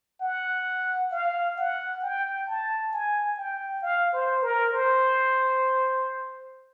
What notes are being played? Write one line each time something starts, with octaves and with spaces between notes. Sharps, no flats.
F#5
F5
F#5
G5
A5
G#5
G5
F5
C5
A#4
C5